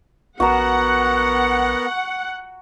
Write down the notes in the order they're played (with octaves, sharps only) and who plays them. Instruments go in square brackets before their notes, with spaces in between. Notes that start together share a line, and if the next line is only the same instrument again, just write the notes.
[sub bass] A#1 [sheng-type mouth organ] B3 A#4 [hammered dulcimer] F#4 A#5 [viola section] F#5